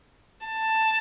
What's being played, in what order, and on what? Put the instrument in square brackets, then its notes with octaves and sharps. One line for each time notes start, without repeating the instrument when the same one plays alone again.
[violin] A5